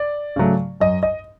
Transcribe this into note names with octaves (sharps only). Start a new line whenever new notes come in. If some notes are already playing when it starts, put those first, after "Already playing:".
Already playing: D5
C#3 F#3 A3
F#2 D#5
D#5